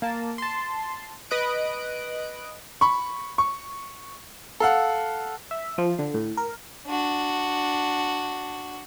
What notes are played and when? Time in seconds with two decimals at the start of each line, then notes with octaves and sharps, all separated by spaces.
0.02 A#3 A5
0.38 A5 C6
1.31 B4 D#5 D#6 F#6 D7
2.81 B5 C#6
3.38 C#6
4.60 A4 F5 F#5
5.51 E5
5.78 F3
5.99 D3
6.14 A2
6.37 A#4
6.87 D4 F#4